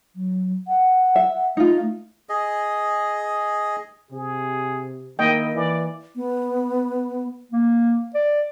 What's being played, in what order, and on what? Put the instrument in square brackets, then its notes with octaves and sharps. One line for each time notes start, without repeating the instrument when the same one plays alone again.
[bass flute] F#3
F#5
[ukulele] E5
[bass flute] A3 [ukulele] D#4 F4
[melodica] G#4 D#5
[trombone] C3 [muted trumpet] G#4
[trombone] D#3 [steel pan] A#3 D#5 G5 [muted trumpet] E4
[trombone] E3 [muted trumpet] D5
[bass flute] B3
[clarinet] A#3
D5